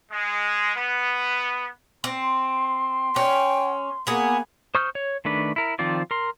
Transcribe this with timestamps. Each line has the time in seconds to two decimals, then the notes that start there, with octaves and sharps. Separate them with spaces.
0.11 G#3
0.75 B3
2.04 C4 C6
3.16 C#4 G5
4.07 A#3 B3 G#4
4.75 C5 C#6 D#6 F6 G6
4.95 C#5
5.25 D#3 A3 D4 B4
5.56 E4 A#4
5.79 D#3 F3 C4 F4 D5
6.11 A#4 C6